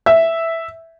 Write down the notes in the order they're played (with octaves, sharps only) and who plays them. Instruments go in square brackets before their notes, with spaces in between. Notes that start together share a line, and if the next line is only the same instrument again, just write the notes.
[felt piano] E5